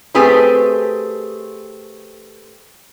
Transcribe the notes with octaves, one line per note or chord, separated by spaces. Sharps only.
A3 C4 G4 G#4 B4 C5